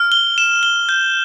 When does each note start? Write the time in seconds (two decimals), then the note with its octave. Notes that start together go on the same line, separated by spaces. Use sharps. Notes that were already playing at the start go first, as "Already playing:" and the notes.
Already playing: F6
0.12 G7
0.38 E7
0.63 G7
0.89 G6